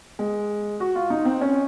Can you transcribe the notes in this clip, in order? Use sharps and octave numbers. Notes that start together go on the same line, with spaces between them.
G#3
F#4
F4
D#4
C4
C#4